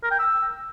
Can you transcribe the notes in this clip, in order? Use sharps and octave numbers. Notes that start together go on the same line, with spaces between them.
A#4
G5
E6